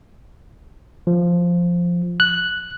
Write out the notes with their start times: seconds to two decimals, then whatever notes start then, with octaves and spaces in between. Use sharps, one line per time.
1.07 F3
2.20 F#6